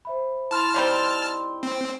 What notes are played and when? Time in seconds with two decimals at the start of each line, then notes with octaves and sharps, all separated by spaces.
0.05 C5 E5 B5
0.51 E4 A5 B5 C6 F6
0.74 D#3 G3 C4
1.63 C4